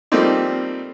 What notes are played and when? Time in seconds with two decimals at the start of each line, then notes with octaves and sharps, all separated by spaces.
0.12 F3 G3 A3 A#3 C4 D#4